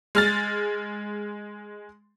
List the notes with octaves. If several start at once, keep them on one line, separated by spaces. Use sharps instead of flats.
G#3 F6 A6